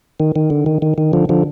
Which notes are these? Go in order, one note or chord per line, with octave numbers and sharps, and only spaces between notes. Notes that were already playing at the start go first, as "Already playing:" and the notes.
D#3
D#3
D3
D#3
D#3
D#3
D3 F3
D3 F3